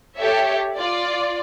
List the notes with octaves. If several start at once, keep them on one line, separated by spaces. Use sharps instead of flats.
G4 A4 C#5 E5
F4 D5